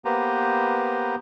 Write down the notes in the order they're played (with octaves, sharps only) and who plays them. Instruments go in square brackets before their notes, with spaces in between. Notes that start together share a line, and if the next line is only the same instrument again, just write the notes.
[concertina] A#3 B3 G4 B4 C5 A#5